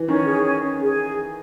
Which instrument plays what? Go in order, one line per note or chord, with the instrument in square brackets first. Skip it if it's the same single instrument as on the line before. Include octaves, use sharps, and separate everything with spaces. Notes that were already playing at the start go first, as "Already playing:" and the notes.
Already playing: [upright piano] E3
[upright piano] D#3 [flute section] C#4
[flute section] G#4
C#4
C#4
G#4